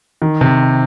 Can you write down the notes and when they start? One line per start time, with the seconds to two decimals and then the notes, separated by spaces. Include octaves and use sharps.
0.22 D#3
0.41 C3